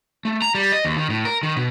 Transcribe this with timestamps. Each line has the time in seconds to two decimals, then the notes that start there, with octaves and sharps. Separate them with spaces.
0.25 A3
0.42 A#5
0.55 G3
0.72 D#5
0.85 D#2
0.97 D#3
1.10 A2
1.25 A#4
1.43 D#3
1.57 B2